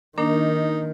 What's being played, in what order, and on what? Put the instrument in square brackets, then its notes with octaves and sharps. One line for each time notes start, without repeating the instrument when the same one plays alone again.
[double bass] D#3 [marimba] A#3 D4 A#4 [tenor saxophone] D#4